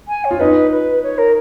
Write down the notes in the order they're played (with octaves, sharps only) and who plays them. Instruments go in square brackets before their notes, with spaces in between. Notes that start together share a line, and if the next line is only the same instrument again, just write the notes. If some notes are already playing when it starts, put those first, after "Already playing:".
[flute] G#5
C#5
[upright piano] F4
[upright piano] D#4 [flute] B4
[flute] B4
C#5
A#4